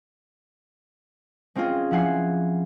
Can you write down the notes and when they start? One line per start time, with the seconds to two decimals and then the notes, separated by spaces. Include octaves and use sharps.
1.55 G#3 C4 C#4 F4 G#4
1.91 F3 E4 F#5 G#5 C7